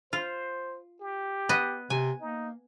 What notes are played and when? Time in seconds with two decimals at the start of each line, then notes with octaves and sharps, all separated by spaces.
0.13 F4 C5
1.01 G4
1.49 B3 D#5
1.90 C3 G#5
2.21 A#3 D#4